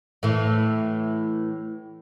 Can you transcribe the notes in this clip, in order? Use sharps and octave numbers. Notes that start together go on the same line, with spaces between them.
A2 E3